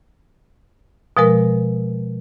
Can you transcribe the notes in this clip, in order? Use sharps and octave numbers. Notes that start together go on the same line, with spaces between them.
B2 F3 G#3 A#4